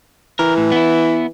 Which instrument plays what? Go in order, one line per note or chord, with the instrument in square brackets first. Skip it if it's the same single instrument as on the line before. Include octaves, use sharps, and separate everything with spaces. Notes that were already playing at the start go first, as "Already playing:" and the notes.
[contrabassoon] E3 [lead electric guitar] A#4
[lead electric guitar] A2
B3 E4